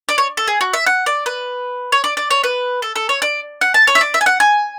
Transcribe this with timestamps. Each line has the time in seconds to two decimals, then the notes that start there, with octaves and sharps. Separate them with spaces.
0.09 D5
0.18 C#5
0.37 A4
0.47 G#4
0.61 F#4
0.73 E5
0.86 F#5
1.06 D5
1.26 B4
1.92 C#5
2.04 D5
2.17 D5
2.31 C#5
2.44 B4
2.82 A4
2.96 A4
3.09 C#5
3.22 D5
3.61 F#5
3.74 A5
3.87 C#5
3.95 E5
4.01 D5
4.14 E5
4.21 G#5
4.26 F#5
4.40 G#5